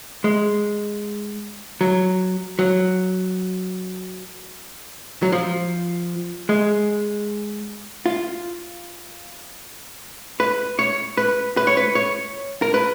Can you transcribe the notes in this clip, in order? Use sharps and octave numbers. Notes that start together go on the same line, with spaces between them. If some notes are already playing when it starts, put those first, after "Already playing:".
G#3
F#3
F#3
F#3
F3
G#3
F4
B4
C#5
B4
B4
C#5
B4
C#5
A#4
B4